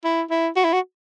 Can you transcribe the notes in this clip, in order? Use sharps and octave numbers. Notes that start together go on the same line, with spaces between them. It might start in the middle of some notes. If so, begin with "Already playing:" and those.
E4
E4
F#4
E4
F#4